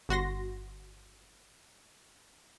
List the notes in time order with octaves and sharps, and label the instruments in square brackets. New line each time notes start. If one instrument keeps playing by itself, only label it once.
[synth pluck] G1 F#4 C6 A#6